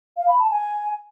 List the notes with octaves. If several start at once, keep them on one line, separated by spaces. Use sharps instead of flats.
F5
B5
A5
G#5